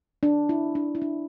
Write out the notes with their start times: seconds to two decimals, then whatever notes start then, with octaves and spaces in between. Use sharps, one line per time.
0.23 D4
0.49 E4
0.75 D4
0.95 E4
1.02 D4